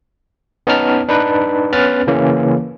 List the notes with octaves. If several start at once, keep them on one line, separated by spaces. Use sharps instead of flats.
B3 C#4 D#4 A5 F6
D4 D#4 B4
B3 C#4 B4 B5 F6 A6
C#3 E3 A#3 C#4